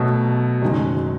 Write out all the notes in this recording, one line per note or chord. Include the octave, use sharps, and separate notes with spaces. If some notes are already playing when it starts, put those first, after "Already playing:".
Already playing: B2 F#3 A3
F#1 F#2 D#3 G#3